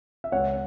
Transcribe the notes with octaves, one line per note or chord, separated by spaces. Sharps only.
E5
C#2 C#5 F#5